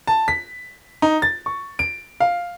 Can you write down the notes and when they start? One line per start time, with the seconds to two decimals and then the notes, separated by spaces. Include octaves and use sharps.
0.07 A5
0.28 B6
1.02 D#4
1.22 A6
1.46 C#6
1.79 D7
2.20 F5